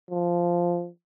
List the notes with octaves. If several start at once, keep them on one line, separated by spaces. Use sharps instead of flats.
F3